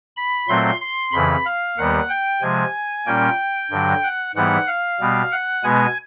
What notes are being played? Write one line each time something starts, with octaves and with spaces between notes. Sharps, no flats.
B5
A#2 F#3 A3 C4 C6
C6
F2 C#3 E3 B5
F5
D#2 D#3 G3 B3 F#5
G5
C3 F3 G#3 G#5
A#2 G3 A#3 C#4 G5
G2 D3 F#3
F#5
G#2 E3 G3 B3 F#5
F5
B2 G3 B3
F#5
B2 G#3 B3 G#5